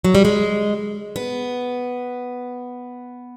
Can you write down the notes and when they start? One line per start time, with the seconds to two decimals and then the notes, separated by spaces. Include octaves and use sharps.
0.04 F#3
0.15 G3
0.25 G#3
1.16 B3